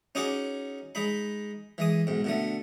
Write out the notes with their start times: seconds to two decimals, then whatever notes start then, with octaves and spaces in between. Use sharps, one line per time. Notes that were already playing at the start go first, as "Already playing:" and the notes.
0.15 C#4 D#4 F#4 G#4 D6
0.95 G#3 D#4 B5
1.78 E3 G#3 D#6
2.07 B1 G#2
2.24 B2 D3 A3